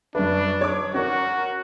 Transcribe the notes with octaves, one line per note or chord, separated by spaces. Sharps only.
F#2 D4 B4
C#5 D6
C#4 F#4 A#4